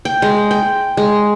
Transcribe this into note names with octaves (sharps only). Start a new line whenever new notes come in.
G5
G#3
G5
G#3